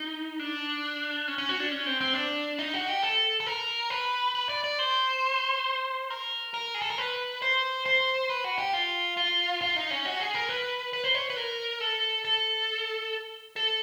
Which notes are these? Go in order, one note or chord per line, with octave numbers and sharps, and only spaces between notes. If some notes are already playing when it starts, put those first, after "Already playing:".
Already playing: D#4
D4
C#4
C#4
F#4
D4
C#4
C4
C4
D4
D#4
F#4
G4
A4
A4
A#4
B4
B4
D5
D5
C5
A#4
A#4
G#4
A4
A#4
B4
C5
C5
B4
F#4
G4
F4
F4
F4
D#4
C#4
F#4
G#4
A#4
B4
B4
C5
C#5
B4
A#4
A4
A4
A4